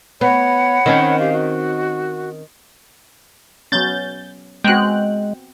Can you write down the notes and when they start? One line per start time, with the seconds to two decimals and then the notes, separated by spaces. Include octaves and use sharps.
0.21 B3 C#5 F#5 B5
0.86 D#3 C4 C#4
1.18 G4 F5
1.33 F#4
3.72 F#3 B3 C#4 G6 A6
4.64 G#3 B3 C4 F#4 G5 F#6